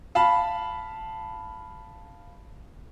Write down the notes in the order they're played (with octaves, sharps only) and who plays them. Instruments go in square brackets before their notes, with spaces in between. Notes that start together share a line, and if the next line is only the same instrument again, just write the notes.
[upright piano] F5 A5 B5